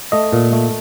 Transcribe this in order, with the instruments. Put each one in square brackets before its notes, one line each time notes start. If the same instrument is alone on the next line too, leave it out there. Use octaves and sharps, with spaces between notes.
[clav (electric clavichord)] A3 D#5
A#2
A3